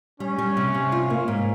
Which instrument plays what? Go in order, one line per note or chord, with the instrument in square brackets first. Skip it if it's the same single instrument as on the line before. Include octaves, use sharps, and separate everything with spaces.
[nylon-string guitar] G3 [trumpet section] C#4
[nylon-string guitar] G3
C3
C3
F4
A#3
G#2